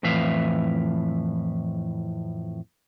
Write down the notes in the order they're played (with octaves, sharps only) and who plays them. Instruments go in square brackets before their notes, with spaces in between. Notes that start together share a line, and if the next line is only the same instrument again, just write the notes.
[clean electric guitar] F2 A2 E3 E5 F5